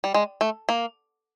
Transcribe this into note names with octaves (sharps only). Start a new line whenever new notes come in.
G3
G#3
A3
A#3